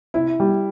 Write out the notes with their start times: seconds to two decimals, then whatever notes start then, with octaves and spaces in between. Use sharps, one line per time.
0.14 C3 E4
0.40 G3